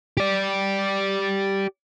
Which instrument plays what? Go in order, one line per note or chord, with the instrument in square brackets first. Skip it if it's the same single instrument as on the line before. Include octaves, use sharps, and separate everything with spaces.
[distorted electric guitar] G4 D5